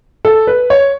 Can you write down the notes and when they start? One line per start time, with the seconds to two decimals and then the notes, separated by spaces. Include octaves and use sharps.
0.25 A4
0.47 B4
0.70 C#5